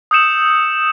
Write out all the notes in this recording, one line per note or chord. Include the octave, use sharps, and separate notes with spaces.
D#6 E6 G6 C#7 E7 F#7